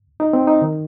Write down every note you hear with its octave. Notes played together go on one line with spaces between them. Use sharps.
D#4
C4
D#4
D#3